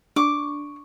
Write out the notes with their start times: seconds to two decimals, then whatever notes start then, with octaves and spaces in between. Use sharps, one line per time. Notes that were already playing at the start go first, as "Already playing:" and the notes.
0.16 D4 C#6 D6